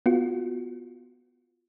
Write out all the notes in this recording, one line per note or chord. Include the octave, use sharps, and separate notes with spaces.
B3 F4 F#4